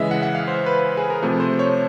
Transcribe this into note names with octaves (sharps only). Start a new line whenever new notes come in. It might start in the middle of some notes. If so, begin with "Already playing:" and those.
Already playing: C#3 E3 G#3 D#5 E5
F#5
F#5
F5
C5
B4
G#4
A#4
C3 F3 A3
C5
C#5